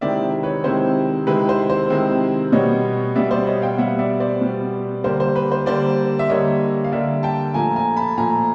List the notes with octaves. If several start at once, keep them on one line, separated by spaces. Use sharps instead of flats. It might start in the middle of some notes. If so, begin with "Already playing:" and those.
C3 D#3 G#3 C4 E4 D5 E5
B4 C#5
C3 D#3 G#3 C4 E4 C5
C3 D#3 G#3 C4 E4 B4
C5
C5
C3 D#3 G#3 C4 E4
B2 G3 B3 C#5 D#5
B2 G3 B3 D5 E5
C5 D5
C#5 D#5
F5 G5
B2 G3 B3 E5 F#5
D5 E5
C5 D5
B2 G3 B3
D3 G3 A#3 C5
C5
B4
C5
D3 G3 A#3 C5 D5
E5
D3 G3 A#3 C#5 D#5
F5
D3 G3 A#3 D5 E5
G5 A5
A#2 F3 A3 G#5 A#5
G#5 A#5
A5 B5
A#2 F3 A3 G#5 A#5